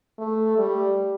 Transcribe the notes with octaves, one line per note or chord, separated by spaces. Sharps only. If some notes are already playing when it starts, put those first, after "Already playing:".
A3
G3